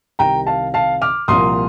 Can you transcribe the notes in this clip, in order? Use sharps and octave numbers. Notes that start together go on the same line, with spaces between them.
C2 C3 D#3 G5 A#5
F5 A5
F5 A5
D6 F6
C2 A#2 F3 A#3 C6 D#6